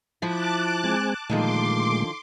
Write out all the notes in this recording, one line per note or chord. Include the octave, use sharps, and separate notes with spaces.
F3 E4 A5 D6 F#6
G#3 C4 G#5
A#2 D3 D#3 F3 G#3 A3 C6 D6